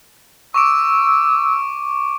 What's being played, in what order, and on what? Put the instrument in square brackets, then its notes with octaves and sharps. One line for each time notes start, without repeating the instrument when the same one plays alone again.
[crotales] C#6 D6 D7 [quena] E6